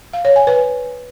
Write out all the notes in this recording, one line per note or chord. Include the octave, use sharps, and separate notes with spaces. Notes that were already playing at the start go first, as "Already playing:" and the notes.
F5
C#5
G#5
B4